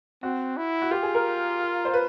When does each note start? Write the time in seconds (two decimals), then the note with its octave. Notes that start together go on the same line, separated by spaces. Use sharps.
0.23 C4 F#4
0.57 E4
0.82 F#4
0.91 F4 G4
1.02 G#4
1.14 A#4
1.85 C5
1.94 B4